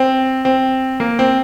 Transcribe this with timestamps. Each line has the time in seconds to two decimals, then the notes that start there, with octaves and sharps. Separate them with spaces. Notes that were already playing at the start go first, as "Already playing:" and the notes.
Already playing: C4
0.45 C4
1.00 A#3
1.19 C4